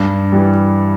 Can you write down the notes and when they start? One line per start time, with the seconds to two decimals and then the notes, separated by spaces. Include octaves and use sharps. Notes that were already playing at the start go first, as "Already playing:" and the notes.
Already playing: G2
0.32 E3 G3